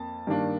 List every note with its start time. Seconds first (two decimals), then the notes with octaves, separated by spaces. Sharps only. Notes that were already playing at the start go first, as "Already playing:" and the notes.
Already playing: F2 A#3 A5
0.27 G2 D#3 A#3 D4